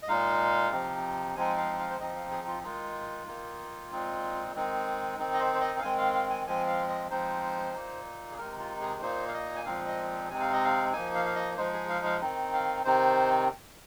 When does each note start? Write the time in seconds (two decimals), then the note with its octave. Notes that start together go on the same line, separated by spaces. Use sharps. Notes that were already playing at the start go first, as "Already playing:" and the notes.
0.03 D#5
0.08 A#2 G#3 D#4 F5
0.72 C3 F3 C4 D#4
1.36 F3 G#3 C4 D#4 G#5
1.57 F5
1.79 F5
1.91 C5
2.00 F3 C4 D#4 D#5
2.16 F5
2.31 G#4
2.47 F4
2.64 D#3 G#3 D#4 F4
3.27 D#3 A#3 D#4
3.92 A#2 G#3 C4 D#4
4.55 D#3 G#3 C4 D#4
5.19 D#3 C4 D#4
5.34 D#5
5.40 C5
5.55 C5
5.61 D#5
5.79 F5
5.82 D#3 G#3 C4 G#5
5.98 F5
6.14 F5
6.30 G#5
6.46 F3 G#3 C4 G#5
6.67 F5
6.88 D#5
7.10 F3 G#3 C4 D#4 C5
7.74 A#2 A#3 D#4
8.31 G#4
8.37 C3 D#3 G#3 D#4 A#4
8.59 F4
8.81 G#4
9.02 A#2 A#3 D#4 C5
9.28 F5
9.34 D#5
9.55 G#5
9.65 A#2 F3 G#3 C4 D#4 F5
9.87 D#5
10.29 C3 G#3 C4 D#4 G#5
10.40 F5
10.53 D#5
10.64 F5
10.93 F3 A#3 D#4 G#5
11.15 F5
11.25 F5
11.35 D#5
11.57 F3 G#3 D#4 C5
11.74 G#4
11.90 F5
12.06 F5
12.21 D#3 C4 D#4
12.53 F5
12.85 C3 D#3 C4 D#4 C5